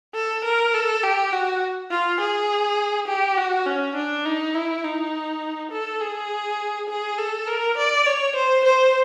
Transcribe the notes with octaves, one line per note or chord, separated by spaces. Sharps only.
A4
A#4
A4
G4
F#4
F4
G#4
G4
F#4
C#4
D4
D#4
E4
D#4
A4
G#4
G#4
A4
A#4
D5
C#5
C5
C5